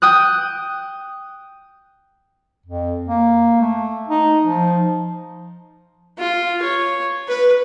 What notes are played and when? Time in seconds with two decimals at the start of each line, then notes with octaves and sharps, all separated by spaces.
0.02 G5 D#6 F#6
2.66 F2
3.08 A#3
3.62 A3
4.08 D#4
4.44 F3
6.18 F4
6.62 C#5
7.28 B4